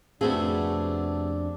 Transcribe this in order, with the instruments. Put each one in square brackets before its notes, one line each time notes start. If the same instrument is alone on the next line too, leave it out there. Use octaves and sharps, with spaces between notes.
[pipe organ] F2 D4 [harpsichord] C3 A3 [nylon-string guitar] B3 F#4 G#4